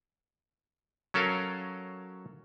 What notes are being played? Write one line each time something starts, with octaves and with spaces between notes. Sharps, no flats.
F#3 C#4 A4 A#4 F5